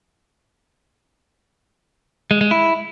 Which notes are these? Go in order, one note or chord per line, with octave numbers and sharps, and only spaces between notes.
G#3
G#3
E4